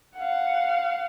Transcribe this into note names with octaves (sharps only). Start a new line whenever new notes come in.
F5 F#5